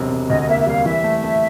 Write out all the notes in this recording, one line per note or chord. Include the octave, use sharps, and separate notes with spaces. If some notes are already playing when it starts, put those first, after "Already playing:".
Already playing: E1 C3 F#3
E1
D2 D#5
D#5
A#3 E5
E5
G3 F5
E3 E5
A3
A3